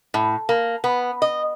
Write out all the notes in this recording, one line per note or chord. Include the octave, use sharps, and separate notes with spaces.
A2
A#3
B3
D#5